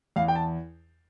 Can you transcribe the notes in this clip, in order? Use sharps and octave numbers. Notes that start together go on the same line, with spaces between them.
E2 F5
G5
A5